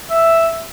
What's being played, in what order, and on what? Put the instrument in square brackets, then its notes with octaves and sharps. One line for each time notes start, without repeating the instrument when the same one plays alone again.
[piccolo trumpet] E5